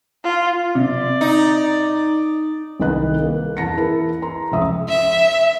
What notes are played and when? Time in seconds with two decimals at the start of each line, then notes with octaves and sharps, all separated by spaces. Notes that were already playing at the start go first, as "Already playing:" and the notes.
0.24 F4
0.75 C3 D5
1.21 D#4
2.80 C2 D#3 B4 D#5 F#6
3.19 A#3
3.57 E2 A5 A#6 C#7
3.77 E4 G#4 A#4 B4
4.22 A#5 C6
4.52 F1 C#2 E5 D#6
4.89 E5